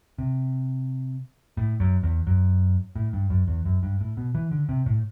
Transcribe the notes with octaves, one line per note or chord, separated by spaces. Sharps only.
C3
A2
F#2
E2
F#2
A2
G2
F#2
E2
F#2
G2
A2
B2
E3
D3
C3
A2